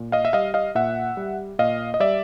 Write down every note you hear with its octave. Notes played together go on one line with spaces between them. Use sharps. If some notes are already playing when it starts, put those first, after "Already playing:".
Already playing: A#2
D#5 F5
E5
G3 D#5 F5
D#5 F5
A#2 E5 F#5
G3
A#2 D#5 F5
D#5
G3 D5 E5